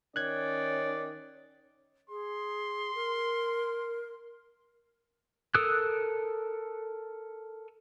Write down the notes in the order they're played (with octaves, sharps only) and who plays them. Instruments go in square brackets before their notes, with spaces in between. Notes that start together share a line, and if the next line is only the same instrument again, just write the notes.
[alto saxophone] D#3 [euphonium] C#4 [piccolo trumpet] D5 [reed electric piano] F#6 G#6
[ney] G#4 [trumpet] C6
[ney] A#4
[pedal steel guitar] A4 A#4 D#6 E6 F#6